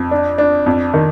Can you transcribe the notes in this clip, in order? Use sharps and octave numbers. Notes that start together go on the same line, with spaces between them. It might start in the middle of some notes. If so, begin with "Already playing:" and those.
Already playing: F2
D4
D4
F2
D#3